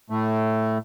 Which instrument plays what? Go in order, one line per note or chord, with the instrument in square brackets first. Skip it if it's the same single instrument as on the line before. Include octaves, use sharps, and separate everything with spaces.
[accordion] A2 A3